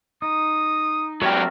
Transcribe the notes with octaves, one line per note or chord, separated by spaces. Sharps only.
D#4 D#6
F#3 A3 C4 G4 A#4